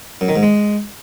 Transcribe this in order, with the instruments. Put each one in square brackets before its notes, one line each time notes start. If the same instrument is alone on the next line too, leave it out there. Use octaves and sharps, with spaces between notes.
[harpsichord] F#2
D#3
G#2
G#3